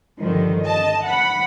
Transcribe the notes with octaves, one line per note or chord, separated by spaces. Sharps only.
G2 D3 D#3 F3
D#5 A5
F#5 B5